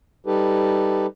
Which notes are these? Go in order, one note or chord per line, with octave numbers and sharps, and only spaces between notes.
G3 D#4 G4 A4 B4